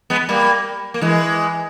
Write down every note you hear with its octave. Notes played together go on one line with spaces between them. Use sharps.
G#3 B3
G3 A#3
A#3
E3 G#3